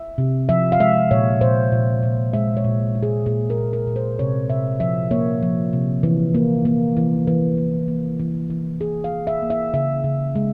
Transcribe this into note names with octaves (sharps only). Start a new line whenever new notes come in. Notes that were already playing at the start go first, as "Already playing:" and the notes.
Already playing: E5
C3
F3 E5
F5
G#3 E5
A#2 C#5
A#2 C5
A#2
A#2
G#3 E5
C#5
A#2
G#3
G#4
A#2 G#4
A#4
A#2
A#4
A#2
C5
C3 C#5
C3 E5
F3 E5
A#3 C#5
F3
C3
E3
A#3
A#3
E3
E3
A#3
A#3
E3
E3
E3 G#4
F5
E3
E5
A#3
E5
C#3 E5
C#3
G#3